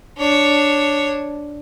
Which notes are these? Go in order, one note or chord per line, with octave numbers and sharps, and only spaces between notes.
D4 C#5